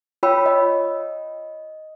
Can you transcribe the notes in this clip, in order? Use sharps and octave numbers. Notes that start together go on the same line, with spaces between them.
F4 C#5 G5 B5 E6
D#5